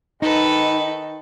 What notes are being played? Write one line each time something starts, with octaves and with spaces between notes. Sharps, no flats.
D#3 D#4 A4 B4